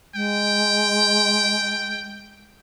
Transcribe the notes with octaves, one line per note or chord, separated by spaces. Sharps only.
G#3 G5